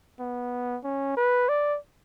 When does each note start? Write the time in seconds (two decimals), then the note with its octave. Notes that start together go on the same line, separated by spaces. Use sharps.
0.20 B3
0.84 C#4
1.17 B4
1.49 D5